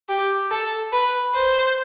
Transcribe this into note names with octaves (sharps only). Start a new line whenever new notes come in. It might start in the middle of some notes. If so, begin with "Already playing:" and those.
G4
A4
B4
C5